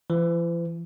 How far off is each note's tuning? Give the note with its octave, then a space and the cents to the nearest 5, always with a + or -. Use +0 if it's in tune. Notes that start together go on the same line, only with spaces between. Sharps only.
E3 +45